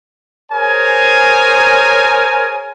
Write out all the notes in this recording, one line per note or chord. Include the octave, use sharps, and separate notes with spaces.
G#4 A#4 C5 C#5 G#5